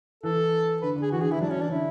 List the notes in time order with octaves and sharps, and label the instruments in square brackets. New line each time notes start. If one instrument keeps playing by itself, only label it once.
[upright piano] E3 [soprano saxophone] A4
[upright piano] D3 [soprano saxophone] B4
[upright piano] D3
[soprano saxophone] G#4
[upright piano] E3 [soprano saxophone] F#4
[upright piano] D3 [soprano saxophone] G#4
[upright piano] E3 [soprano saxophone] E4
[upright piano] F#3 [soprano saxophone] D4
[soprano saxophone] C#4
[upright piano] E3
[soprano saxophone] D4
[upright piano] D3 [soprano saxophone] E4